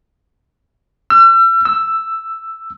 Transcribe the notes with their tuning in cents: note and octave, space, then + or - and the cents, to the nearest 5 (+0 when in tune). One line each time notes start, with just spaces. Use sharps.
E6 +40
E6 +5